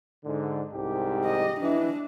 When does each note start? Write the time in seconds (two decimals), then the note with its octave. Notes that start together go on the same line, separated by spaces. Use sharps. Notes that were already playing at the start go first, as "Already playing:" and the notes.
0.24 G#2 D3
0.72 C2 G#2 G4
1.25 D#5
1.61 E3 D4